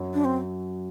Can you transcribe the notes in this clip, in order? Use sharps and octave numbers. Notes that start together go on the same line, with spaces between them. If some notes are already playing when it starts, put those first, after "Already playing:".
Already playing: F#2 F#3
D4
C4